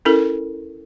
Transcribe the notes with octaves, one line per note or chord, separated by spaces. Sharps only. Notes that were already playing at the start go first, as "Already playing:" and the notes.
C#4 E4 A4 A#4